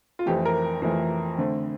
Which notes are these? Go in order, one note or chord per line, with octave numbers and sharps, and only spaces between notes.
F4
F2 E3 A3 G4
A#4
F2 E3 A3
D3 A3 C4